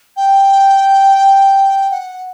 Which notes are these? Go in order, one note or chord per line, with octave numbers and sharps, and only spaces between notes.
G5
F#5